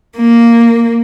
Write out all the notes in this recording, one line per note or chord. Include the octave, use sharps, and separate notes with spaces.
A#3